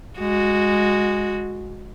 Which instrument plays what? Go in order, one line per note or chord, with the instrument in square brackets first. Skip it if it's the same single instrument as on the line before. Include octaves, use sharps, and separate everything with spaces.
[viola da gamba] G#3 F#4